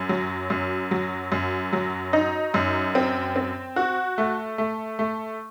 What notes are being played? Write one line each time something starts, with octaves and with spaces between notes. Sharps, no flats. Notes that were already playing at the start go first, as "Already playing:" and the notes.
Already playing: F#2
F#3
F#2
F#3
F#2
F#3
D#4
F#2
C4
C4
F#4
A3
A3
A3